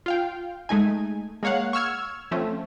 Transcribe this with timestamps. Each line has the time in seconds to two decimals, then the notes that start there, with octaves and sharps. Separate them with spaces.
0.06 F4 F5 G5
0.69 G#3 A3 D#4 G#5
1.43 G#3 A#3 C#5 F5 F#5
1.73 C#6 E6 F6 G#6
2.31 F3 A3 C4 C#4